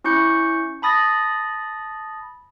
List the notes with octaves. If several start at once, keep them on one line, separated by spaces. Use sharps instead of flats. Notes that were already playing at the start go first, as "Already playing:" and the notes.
C#4 E4 C#6 G6 C#7
A5 B5 D#6 A6 A#6